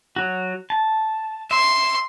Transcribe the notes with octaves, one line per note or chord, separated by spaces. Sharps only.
F#3 F#4
A5
E5 C6